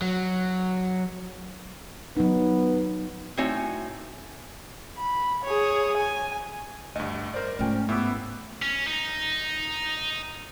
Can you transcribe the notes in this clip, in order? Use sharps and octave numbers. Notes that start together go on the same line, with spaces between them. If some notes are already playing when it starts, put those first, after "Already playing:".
F#3
F#3 B3 D#4
A2 C4 D#4 F#4 C#5 G#5
B5
G#4 C#5
G#5
D2 G2 D#5
A#4 C5 D5
G#2 A3 C#4 F4 G5 G#5
A2 B3 E4 G4 E6
C#4
D#4